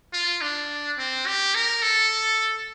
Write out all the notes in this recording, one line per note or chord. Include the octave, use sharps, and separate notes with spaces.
F4
D4
C4
G4
A#4
A4